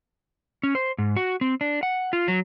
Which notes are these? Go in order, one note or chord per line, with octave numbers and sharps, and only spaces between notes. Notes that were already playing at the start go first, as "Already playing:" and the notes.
C#4
C5
G#2
F#4
C4
D4
F#5
F4
F#3